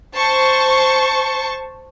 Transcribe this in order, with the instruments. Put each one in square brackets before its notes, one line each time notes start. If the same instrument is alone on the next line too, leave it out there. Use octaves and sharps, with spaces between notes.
[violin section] C5 A5 C#6